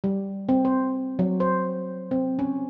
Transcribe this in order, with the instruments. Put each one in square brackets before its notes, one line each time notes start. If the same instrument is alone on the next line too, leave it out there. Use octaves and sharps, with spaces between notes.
[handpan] G3
C4
C5
F#3
C5
C4
C#4